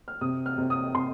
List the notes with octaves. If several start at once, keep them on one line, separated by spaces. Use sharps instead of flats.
F6
C3 D#6
F6
C3
D#6
C3 C6